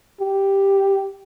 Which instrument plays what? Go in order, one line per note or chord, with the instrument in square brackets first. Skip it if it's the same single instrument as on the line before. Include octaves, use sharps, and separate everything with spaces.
[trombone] G4